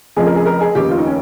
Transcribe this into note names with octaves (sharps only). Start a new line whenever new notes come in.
F1 F2 C#3 F3 G#4
A#4
G#4
A#4
G#4
F1 D#2 C#3 G4
F4
D#4
C#4